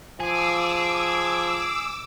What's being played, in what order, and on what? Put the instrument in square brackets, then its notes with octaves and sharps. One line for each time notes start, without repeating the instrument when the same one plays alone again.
[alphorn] F3 [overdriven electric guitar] G#4 [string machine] D6 E6